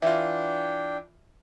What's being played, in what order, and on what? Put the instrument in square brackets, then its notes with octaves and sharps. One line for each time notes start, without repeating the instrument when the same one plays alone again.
[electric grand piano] E3 F4 [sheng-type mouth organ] D4 G5 [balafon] E5